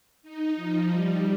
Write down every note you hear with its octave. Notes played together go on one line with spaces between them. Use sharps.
D#4
F3
G3